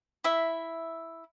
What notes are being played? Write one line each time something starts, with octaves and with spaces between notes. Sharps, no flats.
E4 E5